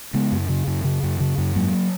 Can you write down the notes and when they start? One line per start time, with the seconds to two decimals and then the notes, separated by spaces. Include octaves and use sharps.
0.14 C#3 G#3 B3
0.32 F#2
0.49 C#3
0.67 F#2
0.84 C#3
1.03 F#2
1.20 C#3
1.38 F#2
1.55 G#2 F#3 A#3